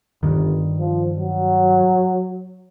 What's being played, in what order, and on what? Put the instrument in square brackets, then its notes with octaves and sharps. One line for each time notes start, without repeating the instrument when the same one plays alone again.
[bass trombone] G1 [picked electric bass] G2 D#3
[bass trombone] F3
F#3